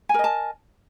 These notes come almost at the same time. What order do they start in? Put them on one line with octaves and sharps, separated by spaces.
G#5 A#4 D#5 A5